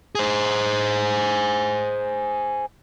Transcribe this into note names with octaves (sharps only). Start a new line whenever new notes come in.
G#4 C5